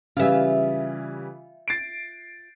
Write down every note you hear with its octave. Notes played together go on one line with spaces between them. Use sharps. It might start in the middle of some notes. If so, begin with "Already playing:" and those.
C#3 E3 G3 F4 E5
A6 C7 D7